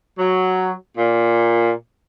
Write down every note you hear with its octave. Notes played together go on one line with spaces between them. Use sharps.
F#3
A#2